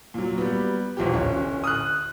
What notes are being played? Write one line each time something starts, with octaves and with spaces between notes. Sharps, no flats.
A#2 F#3
G3 B3
E1 B1 F3 G4
D1 C#4
D#6 F6 F#6